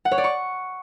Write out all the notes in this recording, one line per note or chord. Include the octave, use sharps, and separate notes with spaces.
F#5
C#5
D5
C#6